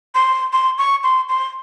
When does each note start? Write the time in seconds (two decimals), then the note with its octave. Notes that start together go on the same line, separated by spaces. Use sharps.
0.15 C6
0.53 C6
0.78 C#6
1.04 C6
1.29 C6